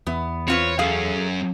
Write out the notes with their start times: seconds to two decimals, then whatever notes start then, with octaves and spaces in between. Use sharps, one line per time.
0.06 E2 B3
0.48 C4 F4 B4 C#5
0.79 F#2 C#4 G#4 A4 F5